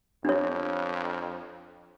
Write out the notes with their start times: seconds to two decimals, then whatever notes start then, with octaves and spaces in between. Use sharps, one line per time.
0.25 F2 D4 C#5